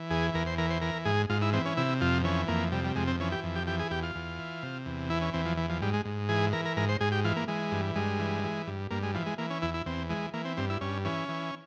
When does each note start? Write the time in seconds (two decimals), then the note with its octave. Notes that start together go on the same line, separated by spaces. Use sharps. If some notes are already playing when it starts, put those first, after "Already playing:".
Already playing: E3
0.10 E2 G#4
0.34 E2 A#4
0.46 C5
0.58 E3 A#4
0.70 C5
0.81 E3 A#4
1.05 G#2 G#4
1.30 G#2 F4
1.42 E4
1.53 E3 C4
1.65 C#4
1.77 C3 E4
2.01 F2 F4
2.24 E3 C#4
2.48 F2 A#3
2.72 C3 G3
2.84 G3
2.95 F2 G#3
3.08 C4
3.20 E3 C#4
3.32 G4
3.43 F2
3.55 G4
3.67 E3 G4
3.79 G#4
3.91 E2 G4
4.03 F4
4.15 E2
4.39 E3
4.63 C3
4.86 E2
5.10 E3 E4
5.21 C#4
5.33 E2 C4
5.45 F3
5.57 E3
5.69 F3
5.82 G#2 G3
5.94 G#3
6.05 G#2
6.29 E3 G#4
6.53 E3 A#4
6.65 A#4
6.77 G#2 A#4
6.89 C5
7.00 G#2 G#4
7.12 G4
7.24 E3 F4
7.36 A#3
7.48 E3 G#3
7.72 G2
7.95 G2 G#3
8.19 E3
8.44 E3
8.67 G2
8.90 G2 A#3
9.03 G#3
9.15 E3 F3
9.26 G#3
9.38 E3 A#3
9.50 C#4
9.62 E2 E4
9.74 E4
9.86 E2 C4
10.10 E3 G#3
10.33 E3 A#3
10.45 C4
10.57 G2 C4
10.70 E4
10.81 G2 C#4
11.05 E3 C#4
11.29 E3